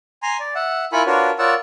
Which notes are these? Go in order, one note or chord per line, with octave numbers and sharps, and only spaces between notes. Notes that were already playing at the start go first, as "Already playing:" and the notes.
G#5 A#5 C6
D5
E5 F#5
E4 F4 A#4 G#5 B5 C#6
D4 F4 F#4 A#4 B4 C#5
F4 A#4 C#5 D5 F#5 E6